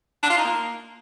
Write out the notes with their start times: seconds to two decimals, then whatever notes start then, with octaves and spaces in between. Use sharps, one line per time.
0.23 D4
0.30 F4
0.37 D#4
0.45 A#3